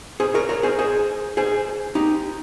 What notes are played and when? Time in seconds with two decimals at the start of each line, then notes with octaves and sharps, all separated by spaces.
0.20 G#4 C5
0.34 A#4 C#5
0.49 A#4 C#5
0.63 G#4 C5
0.79 G#4 C5
1.37 G#4 C5
1.95 D#4 G4